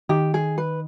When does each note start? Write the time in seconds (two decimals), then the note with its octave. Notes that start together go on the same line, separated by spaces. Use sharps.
0.09 D#3 G4
0.34 G#4
0.58 B4